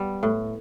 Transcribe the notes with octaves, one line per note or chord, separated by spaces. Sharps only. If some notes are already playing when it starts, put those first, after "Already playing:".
Already playing: G3 B3
A2